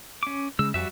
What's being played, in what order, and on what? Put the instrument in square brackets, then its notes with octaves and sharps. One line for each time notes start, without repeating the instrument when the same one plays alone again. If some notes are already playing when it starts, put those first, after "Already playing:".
[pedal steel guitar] C#4 D6
[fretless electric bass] C#3 G#3 [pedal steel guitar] E6
[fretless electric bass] F2 [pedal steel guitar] G3 F#4 E5